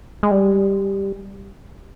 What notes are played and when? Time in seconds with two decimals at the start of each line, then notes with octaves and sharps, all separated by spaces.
0.23 G#3
0.31 G3